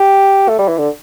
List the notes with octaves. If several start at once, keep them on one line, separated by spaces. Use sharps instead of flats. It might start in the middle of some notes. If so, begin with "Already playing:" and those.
Already playing: G4
A3
G3
E3
D3